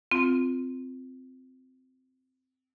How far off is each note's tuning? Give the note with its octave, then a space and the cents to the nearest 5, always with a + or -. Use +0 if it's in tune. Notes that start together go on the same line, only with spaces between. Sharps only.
C4 -15 F4 +0